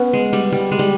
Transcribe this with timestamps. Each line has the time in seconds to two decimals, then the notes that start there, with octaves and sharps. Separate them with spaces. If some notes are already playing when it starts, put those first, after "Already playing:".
Already playing: B3 C#4
0.13 G#3
0.33 G3
0.52 G3
0.72 G#3
0.79 G3